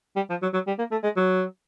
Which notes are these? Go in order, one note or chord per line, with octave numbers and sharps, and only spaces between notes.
G3
F3
F#3
F#3
G3
A#3
A3
G#3
F#3